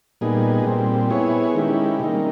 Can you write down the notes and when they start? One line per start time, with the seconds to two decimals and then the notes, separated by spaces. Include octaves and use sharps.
0.21 A#2 G3 B3 D#4 G#4
0.65 A#2 G3 C4
1.10 B3 E4 G#4 C#5
1.55 D#3 G#3 C#4 E4 G4
1.99 C3 D#3 G3 A#3 D#4